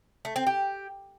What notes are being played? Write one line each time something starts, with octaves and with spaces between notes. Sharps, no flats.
A3
C4
G4